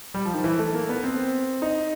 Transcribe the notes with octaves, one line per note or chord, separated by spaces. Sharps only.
G3
F3
D#3
E3
A3
A#3
B3
C4
D#4